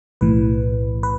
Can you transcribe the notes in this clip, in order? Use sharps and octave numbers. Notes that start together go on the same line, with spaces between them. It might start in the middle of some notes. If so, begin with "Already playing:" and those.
B1 A2 E3 B4
B4